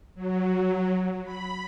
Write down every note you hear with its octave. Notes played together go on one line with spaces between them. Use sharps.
F#3
B5